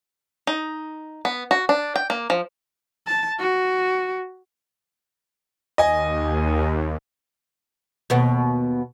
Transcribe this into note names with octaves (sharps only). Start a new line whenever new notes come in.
D#4
B3
F#4
D4
G5
A#3
F3
A5
F#4
D#2 D#5 G#5
D#2 B2 B3